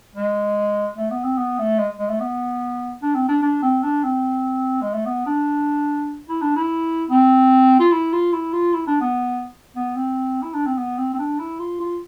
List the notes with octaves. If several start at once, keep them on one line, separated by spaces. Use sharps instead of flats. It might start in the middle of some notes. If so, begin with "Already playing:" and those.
G#3
A3
B3
C4
B3
A3
G#3
G#3
A3
B3
D4
C4
D4
D4
C4
D4
C4
G#3
A3
B3
D4
E4
D4
E4
C4
F4
E4
F4
E4
F4
E4
D4
B3
B3
C4
E4
D4
C4
B3
C4
C4
D4
E4
F4
F4